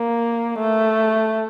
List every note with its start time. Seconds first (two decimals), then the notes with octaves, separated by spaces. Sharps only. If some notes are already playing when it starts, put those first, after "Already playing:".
Already playing: A#3
0.59 A3